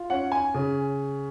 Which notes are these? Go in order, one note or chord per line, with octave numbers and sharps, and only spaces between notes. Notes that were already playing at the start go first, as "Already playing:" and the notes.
Already playing: F4
C#4 F#5
G#5
C#3